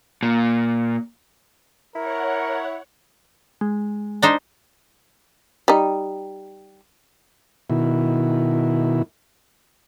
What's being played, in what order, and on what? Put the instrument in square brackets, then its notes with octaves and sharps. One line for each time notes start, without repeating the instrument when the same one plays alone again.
[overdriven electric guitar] A#2
[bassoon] E4 [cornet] A#4 [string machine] C#5 F#5
[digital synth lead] G#3
[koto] D4 D#4 C5
[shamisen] G3 D#4
[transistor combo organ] B2 D#3 E4